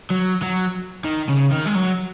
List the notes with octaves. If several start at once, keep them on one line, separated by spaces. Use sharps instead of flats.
F#3
F#3
D#3
C#3
D#3
G#3
F#3